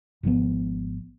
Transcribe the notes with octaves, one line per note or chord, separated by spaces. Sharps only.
G#1 G#2 F3 B3